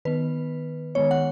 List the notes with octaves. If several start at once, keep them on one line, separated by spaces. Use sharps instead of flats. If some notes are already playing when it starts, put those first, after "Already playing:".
D#3 B3 B4
D#3 G#3 B3 C#5
F#5